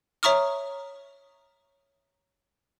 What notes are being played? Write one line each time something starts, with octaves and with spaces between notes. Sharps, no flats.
C#5 E5 A#5 C#6 D#6 F6